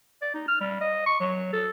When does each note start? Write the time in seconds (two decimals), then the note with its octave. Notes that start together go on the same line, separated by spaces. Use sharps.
0.22 D5
0.34 D#4
0.48 F6
0.61 G3
0.81 D#5
1.06 C#6
1.20 F#3
1.53 A4